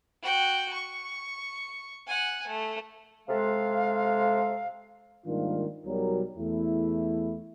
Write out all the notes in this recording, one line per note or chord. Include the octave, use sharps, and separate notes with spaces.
F#4 G5
C#6
F#5 G#5
A3
C3 G#3 A4 F5
G#2 D#3 G3 A#3 D4 F4
B1 B2 F#3 G3 A#4
E2 A3 E4